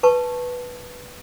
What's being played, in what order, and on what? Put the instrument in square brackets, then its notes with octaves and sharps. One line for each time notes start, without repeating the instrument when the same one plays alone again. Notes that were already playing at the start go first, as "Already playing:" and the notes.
[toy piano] B4 A5 C#6